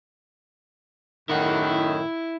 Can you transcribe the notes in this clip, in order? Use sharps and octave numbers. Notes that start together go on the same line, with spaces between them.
F#2 A2 D#3 E4 F#5